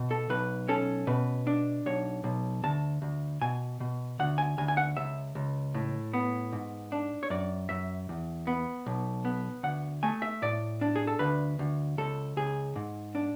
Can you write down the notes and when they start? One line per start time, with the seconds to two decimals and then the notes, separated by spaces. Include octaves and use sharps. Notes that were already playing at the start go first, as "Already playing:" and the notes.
Already playing: B2
0.11 A4
0.30 B1 B4
0.68 C#4 A4
1.07 B2 B4
1.47 D4
1.86 B1 C#5
2.24 B1
2.63 D2 A5
3.02 D2
3.41 B2 G#5
3.80 B2
4.19 D2 F#5
4.38 G#5
4.58 D2 G#5
4.68 G#5
4.77 F#5
4.97 C#2 E5
5.35 C#2
5.74 A2
6.13 B3
6.52 G#2
6.92 D4
7.23 C#5
7.30 F#2 D5
7.69 F#2 E5
8.09 E2
8.47 B3
8.86 B1
9.25 B3
9.63 D2 F#5
10.03 A3 G#5
10.22 E5
10.42 A2 D5
10.81 D4
10.96 G#4
11.07 A4
11.19 D2 B4
11.59 D2
11.98 C#2 A4
12.37 C#2 G#4
12.76 G#2
13.15 D4